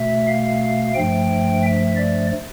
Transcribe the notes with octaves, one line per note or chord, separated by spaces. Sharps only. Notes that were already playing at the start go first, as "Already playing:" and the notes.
Already playing: B2 A3 E5
F5
G2 F3 A3 G5
E5
D5